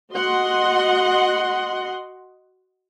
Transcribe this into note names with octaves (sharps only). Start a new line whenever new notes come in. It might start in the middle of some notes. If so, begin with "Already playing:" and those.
F#4 D#5 F#5 C6